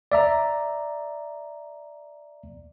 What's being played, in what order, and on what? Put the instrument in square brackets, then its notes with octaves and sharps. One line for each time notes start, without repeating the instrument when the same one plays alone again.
[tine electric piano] D5 E5 A#5